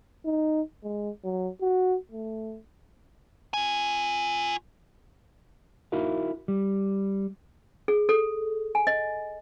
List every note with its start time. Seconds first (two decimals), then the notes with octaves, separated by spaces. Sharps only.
0.26 D#4
0.84 G#3
1.24 F#3
1.62 F#4
2.12 A3
3.54 F4 G#5
5.92 D#4 E4 F#4 A#4 F5
6.48 G3
7.88 G#4
8.09 A4
8.75 G#5
8.87 D#5